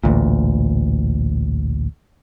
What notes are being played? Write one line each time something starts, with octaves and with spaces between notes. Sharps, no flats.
A1 D2 A#2